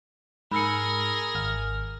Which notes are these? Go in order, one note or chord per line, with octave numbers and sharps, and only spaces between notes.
G#2 G#4 A#4 B5 E6 C#7
G#1 F6